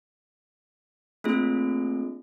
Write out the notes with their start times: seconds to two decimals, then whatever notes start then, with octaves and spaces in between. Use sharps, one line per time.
1.24 A3 A#3 C4 D4 F4 G#4